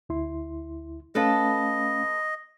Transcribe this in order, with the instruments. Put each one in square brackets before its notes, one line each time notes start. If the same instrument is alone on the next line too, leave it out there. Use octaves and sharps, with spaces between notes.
[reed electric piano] D2 E4 C6
[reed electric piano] A3 C#4 F5 [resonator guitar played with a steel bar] A4 B4 [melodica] D#5